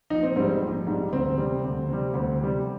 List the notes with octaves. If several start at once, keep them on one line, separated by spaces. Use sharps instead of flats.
A#1 D#4
C4
G#2 G3 C4
A#1
G#2 G3
D2 C4
C3 G3
D2
C3 G3
D2 C4
C3 G3